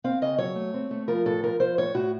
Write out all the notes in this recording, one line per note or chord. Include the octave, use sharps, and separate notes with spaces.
C4 F5
C#3 D#5
F#3 C#5
A3
C4
A3
F3 A#4
A2 A4
F3 A#4
F3 C5
A2 C#5
A2 F#4